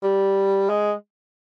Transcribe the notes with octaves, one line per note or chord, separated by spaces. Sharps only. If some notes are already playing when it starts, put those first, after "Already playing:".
G3
G#3